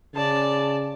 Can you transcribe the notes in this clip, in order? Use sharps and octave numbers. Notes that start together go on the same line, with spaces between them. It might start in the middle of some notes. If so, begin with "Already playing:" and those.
C#3 D5 A5